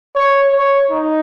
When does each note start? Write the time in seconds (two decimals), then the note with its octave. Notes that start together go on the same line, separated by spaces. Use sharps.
0.15 C#5
0.52 C#5
0.91 D#4